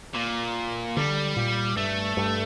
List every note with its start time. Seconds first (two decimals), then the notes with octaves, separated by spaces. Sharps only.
0.16 A#2
0.97 D3 G3
1.36 A#2
1.76 G2 A3
2.17 G2